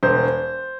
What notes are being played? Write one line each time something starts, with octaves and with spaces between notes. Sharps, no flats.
E1 C5